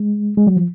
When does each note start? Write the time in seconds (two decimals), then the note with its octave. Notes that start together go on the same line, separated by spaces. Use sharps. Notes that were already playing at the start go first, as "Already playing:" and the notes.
Already playing: G#3
0.37 G#3
0.47 F#3
0.57 F3